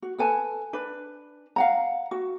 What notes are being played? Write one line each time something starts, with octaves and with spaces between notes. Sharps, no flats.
F#4
A4 B4 G#5 A5
D4 B4
F5 F#5 A#5
F#4